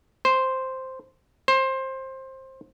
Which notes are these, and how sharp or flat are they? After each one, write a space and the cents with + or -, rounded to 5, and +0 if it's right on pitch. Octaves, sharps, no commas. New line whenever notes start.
C5 +0
C5 +20